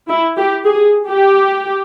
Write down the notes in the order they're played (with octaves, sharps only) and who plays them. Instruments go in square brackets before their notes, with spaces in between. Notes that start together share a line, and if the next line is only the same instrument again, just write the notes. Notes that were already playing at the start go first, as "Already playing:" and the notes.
[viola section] E4
G4
G#4
G4